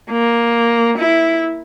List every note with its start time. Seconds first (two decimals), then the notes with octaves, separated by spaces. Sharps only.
0.11 A#3
0.98 E4